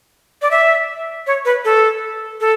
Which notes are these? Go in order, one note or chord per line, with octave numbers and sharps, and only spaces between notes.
D5
E5
C#5
B4
A4
A4